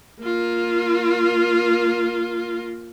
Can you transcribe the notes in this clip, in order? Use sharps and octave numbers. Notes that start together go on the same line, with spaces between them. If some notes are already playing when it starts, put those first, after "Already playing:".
A#3 F4